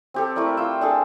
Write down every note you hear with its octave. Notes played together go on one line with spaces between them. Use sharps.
C4 G4 A4
A3 E4 A#4 D5
F4 G5 E6
D4 G#4 A4